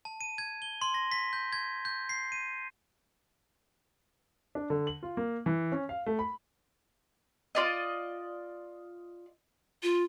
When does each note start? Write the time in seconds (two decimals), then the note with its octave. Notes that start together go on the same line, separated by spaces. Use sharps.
0.05 A5
0.21 D#7
0.38 G#6
0.62 G7
0.82 C6
0.94 A#6
1.12 B6
1.33 G6
1.53 G#6
1.85 G6
2.09 C7
2.32 D#7
4.55 D4
4.70 D3
4.87 F#7
5.03 F4
5.17 A#3
5.46 E3
5.72 C#4
5.89 F5
6.06 A3
6.19 B5
7.55 F4 D5 D#5
9.83 F4